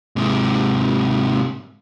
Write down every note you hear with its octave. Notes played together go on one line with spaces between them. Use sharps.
G#2 C3